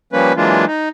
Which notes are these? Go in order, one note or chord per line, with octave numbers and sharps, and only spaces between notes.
F3 G3 A#3 C#4 B4
E3 F#3 G#3 A#3 D4 F4
D#4